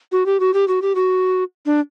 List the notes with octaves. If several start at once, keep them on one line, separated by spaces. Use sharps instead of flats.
F#4
G4
F#4
G4
F#4
G4
F#4
D4